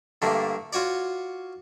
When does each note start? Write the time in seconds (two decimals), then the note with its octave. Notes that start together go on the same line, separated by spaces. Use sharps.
0.22 G2 D3 A3 A#3
0.73 F4 F#4 C#5 D5